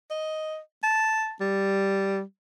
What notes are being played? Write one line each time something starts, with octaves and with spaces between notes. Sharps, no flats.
D#5
A5
G3